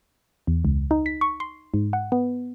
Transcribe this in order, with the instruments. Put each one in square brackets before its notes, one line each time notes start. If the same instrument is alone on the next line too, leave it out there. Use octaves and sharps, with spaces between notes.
[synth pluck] E2
C#2
D#4
B6
C#6
C6
G#2
F#5
B3